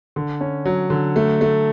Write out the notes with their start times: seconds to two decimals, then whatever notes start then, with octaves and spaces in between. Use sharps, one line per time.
0.16 D3
0.41 C#4
0.65 F#3
0.90 D3
1.16 A3
1.41 A3